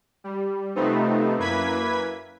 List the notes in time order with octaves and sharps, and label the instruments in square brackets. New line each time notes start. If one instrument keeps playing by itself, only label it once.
[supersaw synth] G3
C3 F3 A3 B3 C4 D#4
F#2 A#3 E4 B4 G#6 B6